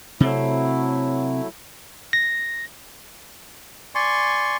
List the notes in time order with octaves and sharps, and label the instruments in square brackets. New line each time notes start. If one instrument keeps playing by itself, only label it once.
[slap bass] C3 C4 [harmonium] F#3 A3 E4
[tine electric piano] A#6
[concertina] D5 G#5 C6 C#6